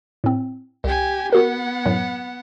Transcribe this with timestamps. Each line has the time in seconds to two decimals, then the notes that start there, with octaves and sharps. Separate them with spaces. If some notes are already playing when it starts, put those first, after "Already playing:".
0.24 A2 C4
0.84 C2 G4 G#5
1.32 B3 F#4 A#4 F#5
1.86 F#2 A2 F#3